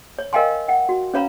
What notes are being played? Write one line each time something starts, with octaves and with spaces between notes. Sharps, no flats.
C#5
A#4 D#5 F5 G5 G#5 C6
F#5 G5
F#4
C#4 B4 C#5 F5 A#5 B5